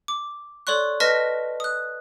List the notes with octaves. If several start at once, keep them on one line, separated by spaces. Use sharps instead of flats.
D6
A4 C#5 D5 C6 C#6 F#6
B4 D#5 A5 F6 A#6 B6
D#6 F#6